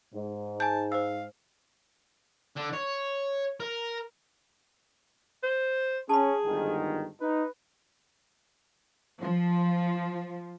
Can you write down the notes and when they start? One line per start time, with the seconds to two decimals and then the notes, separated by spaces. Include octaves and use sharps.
0.15 G#2
0.60 G#5 A5 G6
0.92 C5 F5 E6
2.56 D3
2.73 C#5
3.60 A#4
5.43 C5
6.09 C#4 G#4 A5 B5
6.45 G1 G#2 D#3
7.21 D#4 B4
9.21 F3